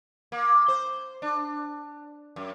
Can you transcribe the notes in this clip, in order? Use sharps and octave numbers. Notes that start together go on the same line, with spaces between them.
A#3
C5
D4
F#2